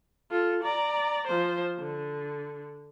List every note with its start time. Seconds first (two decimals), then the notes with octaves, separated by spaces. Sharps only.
0.30 F4 A4
0.63 D5 A#5
1.27 F3 C5
1.79 D3